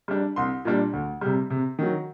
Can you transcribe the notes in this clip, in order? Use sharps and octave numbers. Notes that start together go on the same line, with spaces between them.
G3 D4
C2 C6
A#2 G3 D4
D2
C3 G3
C3
D#3 F#3